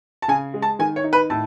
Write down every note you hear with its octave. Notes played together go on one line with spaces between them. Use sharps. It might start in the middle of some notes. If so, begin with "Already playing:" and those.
A5
C#3 G#5
G#3
A5
D#3 G#5
C#5
D#4
B4
A2 A5